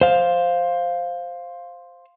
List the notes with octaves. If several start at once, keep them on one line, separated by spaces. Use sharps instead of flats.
C5 F5